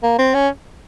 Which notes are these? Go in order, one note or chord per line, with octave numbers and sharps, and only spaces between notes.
A#3
C4
C#4